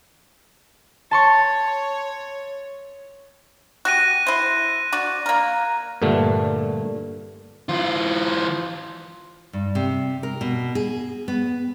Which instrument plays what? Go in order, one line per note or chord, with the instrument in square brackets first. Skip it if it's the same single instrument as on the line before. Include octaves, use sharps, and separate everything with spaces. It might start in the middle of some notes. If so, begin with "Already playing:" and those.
[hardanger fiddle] C#5 [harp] A5 C6 C#6
[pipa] F#4 G4 [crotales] F#6 A#6 D#7
[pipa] E4 C5
D4 F#4 D5
A#3 A#4
[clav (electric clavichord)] G2 A#2 D3 A3
[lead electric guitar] E3 F4
[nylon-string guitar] G2
C3
A#4
B2
G#4
B3